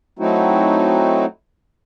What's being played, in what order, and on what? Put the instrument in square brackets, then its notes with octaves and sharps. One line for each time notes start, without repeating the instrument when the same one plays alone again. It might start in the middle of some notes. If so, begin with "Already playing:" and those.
[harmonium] F#3 A3 C4 D#4 E4 F#4